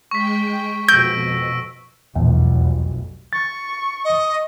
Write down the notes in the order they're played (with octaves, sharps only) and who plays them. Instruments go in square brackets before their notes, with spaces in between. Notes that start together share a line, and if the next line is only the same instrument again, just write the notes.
[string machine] G#3 G5 [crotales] C#6 B6
[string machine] F2 B2 [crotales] E6 A#6 D7 [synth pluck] G6
[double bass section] F1 B1 [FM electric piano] E2
[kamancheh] C#6 [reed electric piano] A6
[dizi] D#5